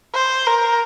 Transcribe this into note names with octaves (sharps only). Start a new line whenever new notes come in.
C5
A#4